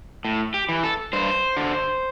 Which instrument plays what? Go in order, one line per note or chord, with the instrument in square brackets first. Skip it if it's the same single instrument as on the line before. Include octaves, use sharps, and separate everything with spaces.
[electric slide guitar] A2
G4
E3
A4
G2 C5
D3